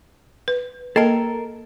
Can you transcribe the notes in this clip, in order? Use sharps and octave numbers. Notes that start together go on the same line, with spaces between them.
B4
A#3 A4 A#4 D#5